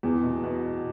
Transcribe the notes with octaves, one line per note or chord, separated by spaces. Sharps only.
E2
B2
B2